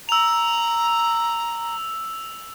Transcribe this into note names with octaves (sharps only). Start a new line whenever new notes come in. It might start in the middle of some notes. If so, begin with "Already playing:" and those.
A#5 E6 F7